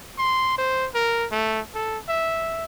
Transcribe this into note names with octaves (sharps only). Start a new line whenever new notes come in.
C6
C5
A#4
A3
A4
E5